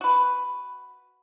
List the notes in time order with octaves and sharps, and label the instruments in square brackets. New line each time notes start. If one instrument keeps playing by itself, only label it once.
[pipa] F#4 B4